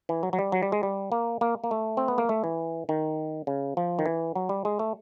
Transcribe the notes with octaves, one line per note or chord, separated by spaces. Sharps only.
E3
F#3
F#3
G3
F#3
G3
G#3
G3
A#3
A#3
A#3
A3
C4
B3
A#3
A3
E3
D#3
C#3
F3
D#3
E3
F#3
G3
G#3
A3